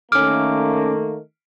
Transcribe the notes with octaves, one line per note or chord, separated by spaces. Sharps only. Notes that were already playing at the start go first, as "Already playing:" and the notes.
D#3 A3 A#3 C#4 D6 F6